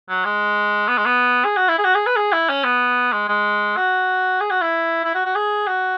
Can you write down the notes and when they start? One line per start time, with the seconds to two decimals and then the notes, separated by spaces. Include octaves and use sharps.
0.09 F#3
0.25 G#3
0.88 B3
0.97 G#3
1.06 B3
1.45 G#4
1.57 F#4
1.68 E4
1.78 G#4
1.84 F#4
1.95 G#4
2.06 B4
2.16 G#4
2.32 E4
2.49 C#4
2.64 B3
3.13 G#3
3.29 G#3
3.77 F#4
4.41 G#4
4.50 F#4
4.61 E4
5.04 E4
5.15 F#4
5.25 F#4
5.36 G#4
5.67 F#4